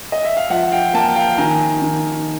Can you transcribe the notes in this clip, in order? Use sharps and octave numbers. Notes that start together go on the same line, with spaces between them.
D#5
E5
F5
F3 E5 F#5
F5 G5
A#3 G5 A5
F5 G5
D#3 G#5 A#5
D#3